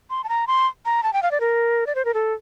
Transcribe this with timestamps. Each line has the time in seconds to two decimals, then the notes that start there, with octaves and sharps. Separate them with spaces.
0.10 C6
0.24 A5
0.29 A#5
0.47 C6
0.85 A#5
1.03 A5
1.13 G5
1.23 F5
1.31 D5
1.40 A#4
1.87 D5
1.95 C5
2.05 A#4
2.14 A4